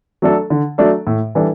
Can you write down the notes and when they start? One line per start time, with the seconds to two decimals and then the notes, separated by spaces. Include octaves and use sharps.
0.22 F#3 A3 D4 A4
0.50 D3
0.78 F#3 A3 D4 A4
1.07 A2
1.35 E3 G3 D4 A4